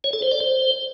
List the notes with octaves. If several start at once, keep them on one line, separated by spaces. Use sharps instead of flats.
C#5
A4
C5
D5
C5